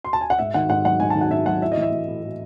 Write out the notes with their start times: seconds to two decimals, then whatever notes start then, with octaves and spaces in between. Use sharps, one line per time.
0.04 C6
0.13 A5
0.21 G#5
0.30 F#5
0.39 G#2 E5
0.54 D#3 F#5
0.69 G#2 F#5
0.85 F#3 F#5
1.00 G#2 G#5
1.10 A5
1.15 D#3
1.21 F#5
1.31 G#2 E5
1.46 F#3 F#5
1.62 A2 E5
1.72 D#5
1.77 E3
1.82 E5
1.92 E3
2.08 A2
2.22 A2